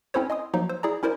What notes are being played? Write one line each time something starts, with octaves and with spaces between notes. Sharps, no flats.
C4 C#4 E4 A4 C5 C#5
D#5 G#5 C6 D#6
F3 F#3 A#3 D#4
C5 E6
E4 G#4 D5 G#5 A#5
C#4 E4 A#4 C5 D5